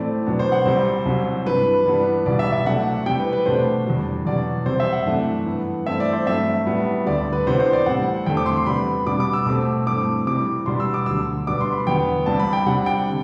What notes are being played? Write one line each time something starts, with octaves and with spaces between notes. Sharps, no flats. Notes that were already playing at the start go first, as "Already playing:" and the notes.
Already playing: A2 E3 A3 C4 D5
B2 F#3 B3 D4
C5
F#5
C2 C3 G3 C5
C2 C3 F#3 C4
G2 E3 G3 D4 B4
G2 E3 B3 D4
C2 B2 G3 D5
E5
E5
C3 F#3 A3 D4 F#5
C3 E3 G3 G5
B4
B4
B2 A3 D4 C5
E2 C3 G3 D4
E2 B2 F#3 D5
C3 G3 C4 C5
E5
F#5
F#2 E3 A3 D4
G2 E3 B3
G2 E3 A3 C4 E5
D5
C5
G2 F#3 A3 C4 E5
A2 G3 B3
D2 D3 G3 D5
B4
C3 E3 B3 D4 C5
C5
D5
A2 G3 C4 F#5
E2 D3 A3 C4 G5
D6
C6
C6
C3 G3 B3 D4 B5
B2 G3 D4 D6
D6
E6
B2 A3 C4 D6
G2 E3 A3 C4 D6
C3 E3 G3 D6
B2 G3 D4 C6
E6
D6
D2 D3 F#3 E6
B2 G3 B3 D4 D6
C6
B5
E2 D3 F#3 B3 G5
C2 C3 G3 D4 A5
B5
G5
C3 G3 D4 F#5
G5
D3